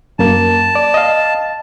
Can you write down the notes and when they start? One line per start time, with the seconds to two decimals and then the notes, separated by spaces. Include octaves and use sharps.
0.19 F#2 A#3 A5
0.75 D5
0.94 D#5 F5